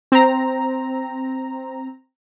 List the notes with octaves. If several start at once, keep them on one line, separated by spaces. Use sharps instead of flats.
C4 A#5